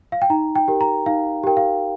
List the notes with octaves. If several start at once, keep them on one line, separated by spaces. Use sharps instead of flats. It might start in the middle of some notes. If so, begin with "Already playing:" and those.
F5
G5
D#4 A#5
G5
G4 A#4
A#5
D#4 F5
G4 A#4 G5
F5